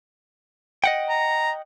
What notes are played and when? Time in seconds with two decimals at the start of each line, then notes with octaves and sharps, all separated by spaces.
0.84 D#5 F#5 G5
1.09 A#5